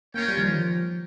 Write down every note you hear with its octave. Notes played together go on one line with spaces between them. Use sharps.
A#3 C#4 F4 A#4 C#5 G5
G3
D#3
F3